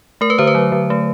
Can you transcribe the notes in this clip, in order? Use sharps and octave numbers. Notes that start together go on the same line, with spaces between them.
A3 A#4
B4
D3 C5
B4
F#3
D3
A3